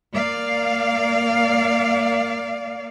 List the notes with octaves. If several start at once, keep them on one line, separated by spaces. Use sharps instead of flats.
A#3 D5 F5